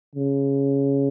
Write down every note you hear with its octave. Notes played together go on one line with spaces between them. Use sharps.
C#3